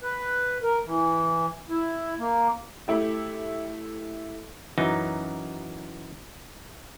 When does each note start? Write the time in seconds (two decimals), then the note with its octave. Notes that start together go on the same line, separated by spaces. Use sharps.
0.02 B4
0.63 A#4
0.86 E3
1.69 E4
2.18 A#3
2.88 A3 E4 G4
4.78 F#2 E3 D#4